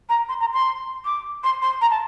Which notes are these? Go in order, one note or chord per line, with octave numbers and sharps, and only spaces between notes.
A#5
C6
A#5
C6
D6
C6
C6
A#5
A5